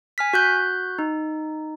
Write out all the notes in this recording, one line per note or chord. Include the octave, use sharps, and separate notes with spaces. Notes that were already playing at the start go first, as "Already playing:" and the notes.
G#5 F6 B6
F#4 F#6 G6
D#4